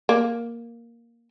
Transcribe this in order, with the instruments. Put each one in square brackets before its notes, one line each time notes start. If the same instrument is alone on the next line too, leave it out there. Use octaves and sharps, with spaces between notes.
[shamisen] A#3